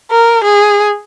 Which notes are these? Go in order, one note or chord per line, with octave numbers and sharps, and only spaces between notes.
A#4
G#4